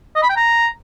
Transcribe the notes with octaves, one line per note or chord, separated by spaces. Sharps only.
D#5
B5
G5
A#5